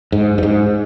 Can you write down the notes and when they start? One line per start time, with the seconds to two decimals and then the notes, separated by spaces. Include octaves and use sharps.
0.12 G#2
0.38 G2
0.43 G#2